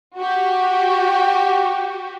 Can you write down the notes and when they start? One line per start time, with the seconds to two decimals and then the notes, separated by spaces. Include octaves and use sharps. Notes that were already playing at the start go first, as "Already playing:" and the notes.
0.18 F#4 G4